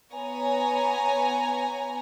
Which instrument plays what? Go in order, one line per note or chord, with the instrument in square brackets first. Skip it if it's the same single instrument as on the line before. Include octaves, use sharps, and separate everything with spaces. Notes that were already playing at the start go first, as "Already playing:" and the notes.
[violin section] B3 C#5 G#5 A#5